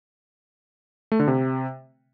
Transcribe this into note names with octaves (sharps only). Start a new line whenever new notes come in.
A3
D3
C3